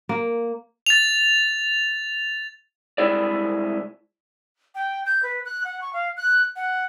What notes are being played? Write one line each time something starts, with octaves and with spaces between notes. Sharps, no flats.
A#3
A6 F7
C2 G#2 G#3 E4 G#4 D5
G5
G6
B4
F#6
F#5
C#6
F5
F#6
F#5